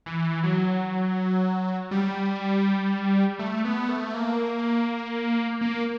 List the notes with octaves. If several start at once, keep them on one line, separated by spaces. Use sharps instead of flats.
E3
F#3
G3
A3
B3
A3
A#3
A#3